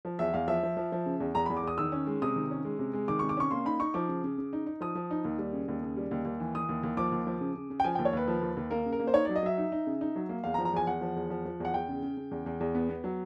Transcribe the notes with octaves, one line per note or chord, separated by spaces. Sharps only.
F3
E2 E5
E2 F5
F3 E5
F3
F3
F3
C#3
E2
E2 A#5
E2 B5
D6
E2 D#6
D#3 E6
C#4
G#3
C3 D#6
D#3
C#4
G#3
C3
G#3
D#3 D6
C3 C#6
D6
C#4 C#6
A#3 C6
D#4 B5
D#4 C#6
F3 D6
C#3
C#3
C#3
D#4
D#4
F3 D#6
F3
D#4
D#2
G3
C#3
D#2
C#3
G3
D#2
D#2
E3
E3 D#6
D#2
D#2
F3 D6
D#2
F3
C#3
C#3
C#3
G5
F3 G#5
D#2 G5
C#5
D#2 B4
F3
D#2
D#2
A#3 A#4
C#3
A#4
A#3
C5
D#4 C#5
F#3 D5
D#5
F#3 E5
D#4
D#4
C#3
D#4
F#3
A#3
E2 F5
A#5
F3
A#5
E2 G#5
E2 F#5
F3
E2
F3
F3
E2
F#5
E2 G5
C#3
C#3
C#3
E2
E2
E2
B3
B3
F#3